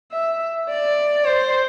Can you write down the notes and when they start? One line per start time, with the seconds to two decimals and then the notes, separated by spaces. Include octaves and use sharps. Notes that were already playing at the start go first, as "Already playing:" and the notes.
0.12 E5
0.69 D5
1.25 C5